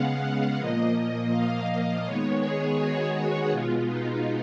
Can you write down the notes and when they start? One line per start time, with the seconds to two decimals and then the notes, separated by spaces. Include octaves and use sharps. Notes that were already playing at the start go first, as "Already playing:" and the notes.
Already playing: C#3 G#3 B3 F5 F#5
0.58 A#2 F3 A#3 D#5
0.95 D#5
1.32 F5
1.67 D#5
2.04 D#3 G#3 B3 C#5
2.42 G#4
2.78 F#4
3.15 G#4
3.51 B2 G#3 B3 F4
3.88 D#4